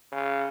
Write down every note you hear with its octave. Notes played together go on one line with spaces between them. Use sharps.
C#3